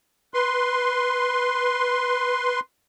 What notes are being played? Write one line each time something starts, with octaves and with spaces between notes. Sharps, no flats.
B4 C6